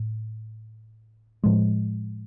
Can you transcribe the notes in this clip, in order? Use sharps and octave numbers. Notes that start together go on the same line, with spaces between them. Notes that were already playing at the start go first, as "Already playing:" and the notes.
Already playing: A2
A2 F3 G#3